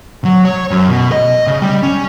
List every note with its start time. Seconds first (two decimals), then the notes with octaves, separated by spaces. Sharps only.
0.25 F#3
0.44 C#5
0.71 F#2
0.89 B2
1.12 D#5
1.47 C#3
1.62 G3
1.83 C#4